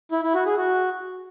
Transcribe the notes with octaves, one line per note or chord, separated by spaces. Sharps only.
E4
E4
F#4
G#4
F#4